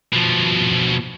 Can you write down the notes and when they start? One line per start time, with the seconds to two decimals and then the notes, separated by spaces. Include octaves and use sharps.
0.13 B2 F3